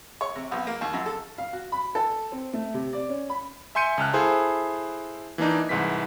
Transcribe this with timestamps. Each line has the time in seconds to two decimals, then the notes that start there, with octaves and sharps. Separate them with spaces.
0.21 C#5
0.35 C3
0.51 B1
0.67 A#3
0.81 D#2
0.93 F#2
1.06 A4
1.38 F5
1.53 F#4
1.72 B5
1.95 A4
2.32 C4
2.53 A3
2.74 C3
2.93 D5
3.09 C#4
3.30 B5
3.75 E5 G#5 C6 G6 C#7 D#7
3.98 C#2 A5 F6 F#6
4.13 E4 G#4 A4 C5 F5
5.38 E3 A#3 D4 D#4
5.69 C2 G#2 E3 B6